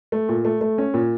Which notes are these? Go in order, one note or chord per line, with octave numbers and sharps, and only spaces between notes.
A3
A#2
A3
A3
C#4
A#2